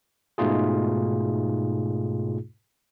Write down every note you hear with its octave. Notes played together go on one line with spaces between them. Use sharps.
G#2 B2 A3 D#4 F4 G#4